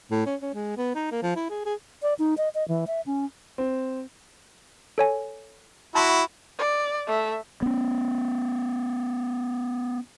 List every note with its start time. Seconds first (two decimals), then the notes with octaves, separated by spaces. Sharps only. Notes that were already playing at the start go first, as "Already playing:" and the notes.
0.11 A2
0.26 C#4
0.42 C#4
0.55 G#3
0.77 B3
0.95 D#4
1.11 A#3
1.23 F3
1.36 E4
1.50 G#4
1.66 G#4
2.02 D5
2.19 D#4
2.38 D#5
2.55 D#5
2.68 E3
2.87 E5
3.06 C#4
3.58 C4
4.98 A4 C#5 G#5
5.95 E4 F#4 A5 C6 C#6
6.59 D5
7.07 A3 E5
7.62 B3 C#4